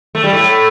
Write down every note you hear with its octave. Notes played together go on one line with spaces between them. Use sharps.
A3
G3
A2 A3